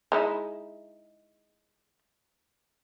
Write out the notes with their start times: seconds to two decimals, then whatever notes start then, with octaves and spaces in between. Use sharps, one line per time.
0.12 G#3 D#4 E4